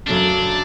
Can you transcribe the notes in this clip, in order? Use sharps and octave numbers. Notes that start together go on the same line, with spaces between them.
F#2 C#3 F#3 A3 D4